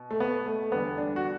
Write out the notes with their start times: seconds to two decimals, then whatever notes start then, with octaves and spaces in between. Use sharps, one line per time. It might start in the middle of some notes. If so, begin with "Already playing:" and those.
Already playing: B2
0.11 A3
0.20 B3
0.46 A3
0.72 E2 D3 G3 B3
0.98 D4
1.16 F#4